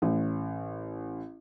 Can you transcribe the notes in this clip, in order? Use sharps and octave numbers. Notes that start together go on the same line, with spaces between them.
A1